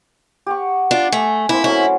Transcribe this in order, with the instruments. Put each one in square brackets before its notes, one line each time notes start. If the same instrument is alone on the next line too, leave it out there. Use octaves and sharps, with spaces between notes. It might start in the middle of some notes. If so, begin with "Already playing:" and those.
[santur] G4 F#5 C#6
[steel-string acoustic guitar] D4 F4 [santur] A#5
[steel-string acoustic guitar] A3 [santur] G#5 A#5
[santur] A#3 C4 [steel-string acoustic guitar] E4
[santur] F#3 A3 C#4 [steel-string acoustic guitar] E4